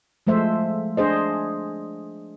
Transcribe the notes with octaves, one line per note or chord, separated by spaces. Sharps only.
F3 G#3 A3 C5 E5
D4 G#4 C5 D#5